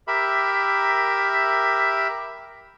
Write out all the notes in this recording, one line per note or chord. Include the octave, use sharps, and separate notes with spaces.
G4 A#4 E5 B5